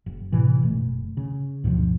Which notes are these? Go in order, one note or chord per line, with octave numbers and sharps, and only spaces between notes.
F#1
A2 C3 E3
F#1 B2 A3
C#3
D2 G2 B2 F3